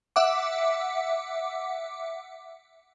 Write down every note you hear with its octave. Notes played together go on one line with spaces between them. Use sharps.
E5 F#5 D6